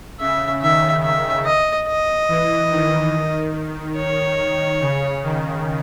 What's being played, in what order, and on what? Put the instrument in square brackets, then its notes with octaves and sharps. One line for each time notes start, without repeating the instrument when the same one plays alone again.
[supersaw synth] C#3 [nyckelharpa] E5
[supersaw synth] D#3 [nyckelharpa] E5
[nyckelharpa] E5
D#5
D#5
[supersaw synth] E3
D#3
[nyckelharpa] C#5
[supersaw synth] C#3
D#3